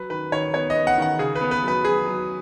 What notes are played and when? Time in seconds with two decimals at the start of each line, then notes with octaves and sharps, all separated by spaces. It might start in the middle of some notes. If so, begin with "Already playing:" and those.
Already playing: F#3 B4
0.10 D#3 B4
0.32 D#3 C#5
0.54 B3 C#5
0.70 D#5
0.75 B3
0.87 F#5
0.97 D#3 F#5
1.19 C#3 G#4
1.35 B4
1.41 B3
1.51 B4
1.62 F#3
1.68 B4
1.84 F#3 G#4
2.05 F#3